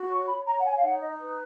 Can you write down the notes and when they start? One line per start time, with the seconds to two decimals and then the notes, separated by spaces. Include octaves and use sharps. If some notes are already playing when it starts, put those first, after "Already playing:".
Already playing: F#4
0.08 C#5 C#6
0.26 B5
0.45 C#5 A#5
0.58 F#5
0.64 G#5
0.76 F5
0.82 D#4 F#5
1.01 D#5
1.20 B4